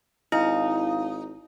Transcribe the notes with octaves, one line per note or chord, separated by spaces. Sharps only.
G#1 D#4 E4 F5